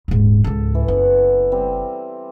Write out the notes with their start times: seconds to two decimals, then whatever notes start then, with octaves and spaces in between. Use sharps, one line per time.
0.08 D#1 G#2
0.44 C#2 G#2 A4
0.75 E3
0.88 F#1 B3 F#5
1.52 G3 C4